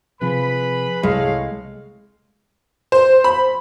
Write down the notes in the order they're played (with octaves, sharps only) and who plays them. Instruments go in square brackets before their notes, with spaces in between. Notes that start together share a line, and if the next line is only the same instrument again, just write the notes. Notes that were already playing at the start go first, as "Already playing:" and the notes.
[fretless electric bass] C3 F3 [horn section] G#4 B4 B5
[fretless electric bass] C2 [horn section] A2 C#5 F5 [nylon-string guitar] G#3
[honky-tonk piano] C5
B5